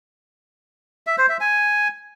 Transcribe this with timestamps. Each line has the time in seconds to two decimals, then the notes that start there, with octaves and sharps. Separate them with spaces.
1.07 E5
1.18 C5
1.29 E5
1.40 G#5